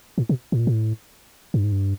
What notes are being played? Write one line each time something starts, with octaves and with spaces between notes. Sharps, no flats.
A2
B2
A2
A#2
A2
G2
G#2
G2